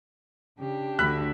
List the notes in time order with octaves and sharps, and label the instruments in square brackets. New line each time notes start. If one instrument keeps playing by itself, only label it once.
[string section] C#3 [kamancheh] D4 G4
[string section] D2 D3 [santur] E5 B5 [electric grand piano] F#6